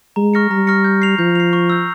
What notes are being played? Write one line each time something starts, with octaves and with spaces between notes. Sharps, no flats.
G#3 A#5
C#6 F6 A#6 C#7
G3 A#5
C#6 F6 A#6 C#7
G6
C7 F7
F3 G6
C7 F7
C#6
E6 G6